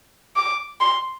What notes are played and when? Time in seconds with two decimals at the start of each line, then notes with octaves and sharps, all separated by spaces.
0.36 D6
0.81 C6